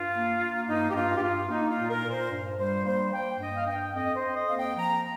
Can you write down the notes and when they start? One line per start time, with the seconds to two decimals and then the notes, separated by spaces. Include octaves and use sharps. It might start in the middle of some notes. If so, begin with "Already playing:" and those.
Already playing: G2 F4
0.12 A#3
0.40 A#3
0.66 G2 D#4
0.89 G4
0.94 G2 F4
1.17 G4
1.21 G2 F4
1.48 A#3 D#4
1.69 F4
1.76 A#2
1.90 A#4
2.03 A#2
2.10 C5
2.30 G2
2.58 G3 C5
2.85 A#3 C5
3.12 A#3 G5
3.40 G2 D#5
3.57 F5
3.67 G2 G5
3.94 F2 D#5
4.15 C5
4.21 F2
4.35 D#5
4.47 A#3 F5
4.56 G5
4.76 F3 A#5